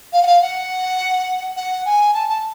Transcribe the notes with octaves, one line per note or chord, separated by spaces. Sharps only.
F5
F#5
F5
F#5
F#5
G#5
A5
A5